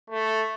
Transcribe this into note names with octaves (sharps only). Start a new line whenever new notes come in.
A3